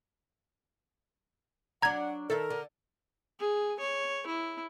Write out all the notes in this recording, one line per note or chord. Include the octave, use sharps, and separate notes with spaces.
F#3 D4 F#5 A#5 G#6
D#3 A4 A#4 E5
D3
G#4
C#5
E4